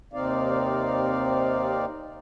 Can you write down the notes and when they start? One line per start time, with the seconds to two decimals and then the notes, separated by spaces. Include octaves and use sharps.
0.13 D#2 C3 C4 D#4 D5 F5